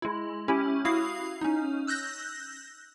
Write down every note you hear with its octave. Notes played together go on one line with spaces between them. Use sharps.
G#3 E4
C#4 E4 G4
E4 F#4 F5 D#6 C7
C#4 D#4
E6 F#6 G6 A#6